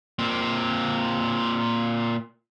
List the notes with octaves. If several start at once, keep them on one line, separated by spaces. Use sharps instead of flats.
A#2 C4